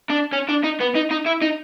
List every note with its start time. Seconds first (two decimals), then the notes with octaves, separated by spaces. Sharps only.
0.10 D4
0.33 C#4
0.49 D4
0.64 D#4
0.80 B3
0.95 D#4
1.11 D#4
1.26 E4
1.42 D#4